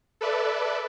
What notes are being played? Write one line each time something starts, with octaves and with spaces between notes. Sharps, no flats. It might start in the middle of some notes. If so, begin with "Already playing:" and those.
A4 B4 D5 E5